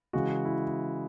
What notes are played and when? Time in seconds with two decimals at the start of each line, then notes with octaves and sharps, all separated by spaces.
0.13 C#3 E3 G#3 F#4
0.45 E4